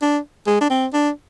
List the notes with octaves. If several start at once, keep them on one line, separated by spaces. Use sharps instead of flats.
D4
G#3
D4
C4
D4